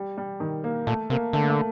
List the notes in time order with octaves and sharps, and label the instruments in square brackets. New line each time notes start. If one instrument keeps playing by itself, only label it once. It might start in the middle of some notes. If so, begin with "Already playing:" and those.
Already playing: [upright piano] G3
G3
D#3
A#3
[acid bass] A#2 [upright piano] A3
[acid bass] C3 [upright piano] A#3
[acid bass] D3 [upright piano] A3
[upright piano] A#3
A3